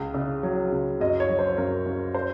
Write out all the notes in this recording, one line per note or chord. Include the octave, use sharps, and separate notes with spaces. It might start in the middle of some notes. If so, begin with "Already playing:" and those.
Already playing: C#2 C#3
C#3
F#3
C#2
F#2 D#5
C#5
F#3
C5
F#2 A#4
F#2
C5